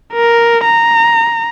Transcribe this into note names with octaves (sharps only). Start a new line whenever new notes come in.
A#4
A#5